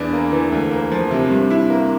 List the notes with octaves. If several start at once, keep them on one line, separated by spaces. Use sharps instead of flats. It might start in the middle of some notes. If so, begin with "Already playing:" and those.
Already playing: E2 E3 D4
A#3
E3
D2
A#3
F3
C3
G2
E4
A#3